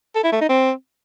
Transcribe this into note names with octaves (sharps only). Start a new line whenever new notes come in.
A4
E4
A3
D#4
C4